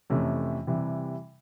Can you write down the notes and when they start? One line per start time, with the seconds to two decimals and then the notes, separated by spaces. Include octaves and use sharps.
0.10 F2 C3 E3 A3 C#4
0.67 C3 E3 G3